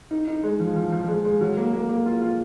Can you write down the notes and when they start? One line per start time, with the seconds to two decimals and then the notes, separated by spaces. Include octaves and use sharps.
0.11 D#4
0.28 D#4
0.43 G#3
0.60 F3
0.76 F3
0.92 F3
1.08 G#3
1.25 G#3
1.41 F#3
1.57 A#3
1.73 A#3
1.89 A#3
2.06 F4
2.22 F4